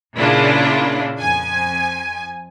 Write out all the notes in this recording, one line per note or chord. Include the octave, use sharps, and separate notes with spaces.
A#2 C#3 A#3 D4 E4 F4
F2 G#5